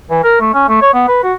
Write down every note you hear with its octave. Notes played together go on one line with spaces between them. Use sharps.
E3
A#4
A3
C#4
A3
C#5
B3
B4
F#4